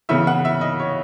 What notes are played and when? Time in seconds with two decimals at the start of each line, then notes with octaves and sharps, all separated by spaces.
0.09 C#3 E3 B3 E5
0.27 F#5
0.45 E5
0.61 D#5
0.79 C#5